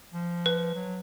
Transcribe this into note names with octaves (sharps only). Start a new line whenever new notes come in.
F3
B4
F#3